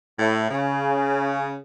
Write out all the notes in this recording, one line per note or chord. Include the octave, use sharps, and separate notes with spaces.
A2
C#3